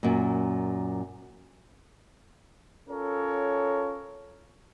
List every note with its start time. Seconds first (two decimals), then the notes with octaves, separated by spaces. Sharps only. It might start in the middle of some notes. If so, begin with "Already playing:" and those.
0.03 F#2 A#2
2.87 C#4 F4 A4 A#4 C#5